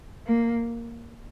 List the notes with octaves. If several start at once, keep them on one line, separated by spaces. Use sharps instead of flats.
A#3